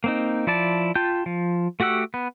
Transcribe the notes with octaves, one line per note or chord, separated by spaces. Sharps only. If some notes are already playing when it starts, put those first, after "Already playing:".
A#3 C4 D#4
F3 E4 D5 A5
F4 G5 A5 G6
F3
A3 F#4 G4 F#5 E6
B3